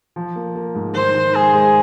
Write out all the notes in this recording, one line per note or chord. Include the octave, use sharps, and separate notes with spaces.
F3
A#3
A#3
G#2
D#3 C5
D#3
G#3 G#4
G#3